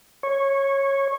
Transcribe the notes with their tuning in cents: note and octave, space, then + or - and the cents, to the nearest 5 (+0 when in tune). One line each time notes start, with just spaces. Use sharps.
C#5 -15